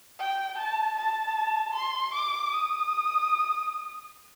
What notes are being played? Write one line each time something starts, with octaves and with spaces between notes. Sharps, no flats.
G5
A5
A5
C6
D6
D#6